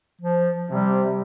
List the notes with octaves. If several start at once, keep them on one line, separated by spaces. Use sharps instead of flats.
F3
C3 G3